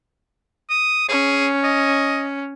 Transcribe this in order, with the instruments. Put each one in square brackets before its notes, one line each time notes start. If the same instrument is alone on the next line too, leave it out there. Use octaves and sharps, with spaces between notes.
[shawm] D#6
[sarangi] C#4 [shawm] G#4
[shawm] D#5